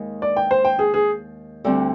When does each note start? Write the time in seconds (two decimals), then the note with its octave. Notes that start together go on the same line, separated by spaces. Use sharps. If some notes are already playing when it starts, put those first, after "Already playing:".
Already playing: D#2 D#3 G#3
0.22 D5
0.37 G5
0.51 C5
0.65 G5
0.79 G#4
0.94 G#4
1.64 D2 D3 G3 C4